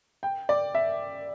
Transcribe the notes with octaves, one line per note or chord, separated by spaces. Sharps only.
G5
D5
E5